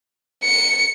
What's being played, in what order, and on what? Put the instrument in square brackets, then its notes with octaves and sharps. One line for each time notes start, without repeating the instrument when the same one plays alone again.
[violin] C#7